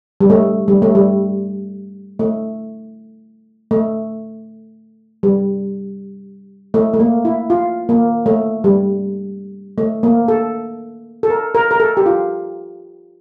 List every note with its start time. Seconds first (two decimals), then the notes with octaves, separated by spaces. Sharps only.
0.21 G3
0.30 A3
0.68 G3
0.82 A3
0.95 G3
2.19 A3
3.71 A3
5.23 G3
6.74 A3
6.94 A3
7.00 A#3
7.25 E4
7.50 F4
7.89 A#3
8.26 A3
8.64 G3
9.78 A3
10.03 A#3
10.28 A4
11.23 A4
11.30 A#4
11.55 A#4
11.71 A#4
11.80 A4
11.97 G4
12.06 F4